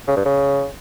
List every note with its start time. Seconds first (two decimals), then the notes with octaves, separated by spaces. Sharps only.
0.08 C#3
0.16 G2
0.25 C#3